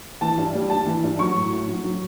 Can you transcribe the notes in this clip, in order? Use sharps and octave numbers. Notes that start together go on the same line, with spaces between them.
E3 A5
G2
G3
G2 A5
E3
G2
F#3 C#6
A2
A2
F#3
F#3